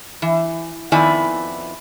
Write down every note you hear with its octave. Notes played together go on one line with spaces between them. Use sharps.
E3
F2 D#3 B3 E4 D5 G#5